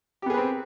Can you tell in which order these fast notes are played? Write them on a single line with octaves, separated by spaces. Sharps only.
G4 B3 G#4 B4 C4